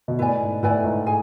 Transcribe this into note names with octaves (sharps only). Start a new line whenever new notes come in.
B2
A2 E4 B4 D5 G#5
G#2
A2 E4 B4 D5 G#5
G#2
G#4 G#5